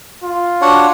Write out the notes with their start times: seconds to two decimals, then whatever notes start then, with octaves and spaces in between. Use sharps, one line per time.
0.24 F4
0.61 D4 F#4 C#5 F#5